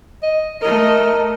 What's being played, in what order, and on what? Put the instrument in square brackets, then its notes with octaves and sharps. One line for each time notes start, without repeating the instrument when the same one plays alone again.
[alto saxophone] D#5
[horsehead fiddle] A3 D#5 [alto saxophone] A#4